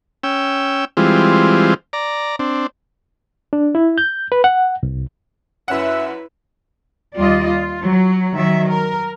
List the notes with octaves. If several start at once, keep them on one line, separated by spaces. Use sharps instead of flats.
C#4 G5 E6
E3 G3 G#3 C4 F4
D5 A#5
C4 D4
D4
E4
G6
B4
F#5
C2
F#2 C#4 E4 B4 E5 F#5
D#2 G3 F4 D5 D#5
F4
F#3
D#3 F#3 E5
A#4